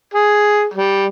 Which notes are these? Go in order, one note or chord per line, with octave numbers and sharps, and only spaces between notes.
G#4
G3